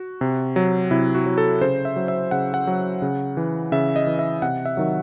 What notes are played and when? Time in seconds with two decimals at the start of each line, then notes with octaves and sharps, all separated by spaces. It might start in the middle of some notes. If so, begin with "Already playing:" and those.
Already playing: F#4
0.21 C3
0.56 F#3
0.91 C3 E4
1.15 F#4
1.26 F#3
1.38 A4
1.61 C#3 C5
1.85 E5
1.96 F#3
2.08 E5
2.31 C#3 F#5
2.54 F#5
2.67 F#3
3.02 C#3
3.37 E3
3.72 C#3 E5
3.96 D#5
4.07 E3
4.19 E5
4.42 C3 F#5
4.65 E5
4.77 D#3 F#3